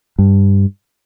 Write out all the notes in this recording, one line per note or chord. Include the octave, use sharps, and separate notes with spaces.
G2